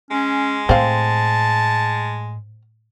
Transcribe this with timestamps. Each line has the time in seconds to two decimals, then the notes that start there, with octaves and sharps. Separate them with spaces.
0.11 G#3 C#4
0.69 A2 C4 F5 A5